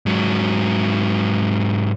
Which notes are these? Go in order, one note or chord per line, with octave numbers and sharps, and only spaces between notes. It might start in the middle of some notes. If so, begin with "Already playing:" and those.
G#2 F#3